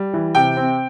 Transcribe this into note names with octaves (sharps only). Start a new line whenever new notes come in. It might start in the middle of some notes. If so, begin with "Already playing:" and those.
Already playing: G3
E3
C3 G5
C4